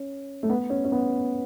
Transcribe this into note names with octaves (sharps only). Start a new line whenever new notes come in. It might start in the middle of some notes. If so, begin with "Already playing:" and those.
Already playing: C#4
A3
B3
C#4
C#4
B3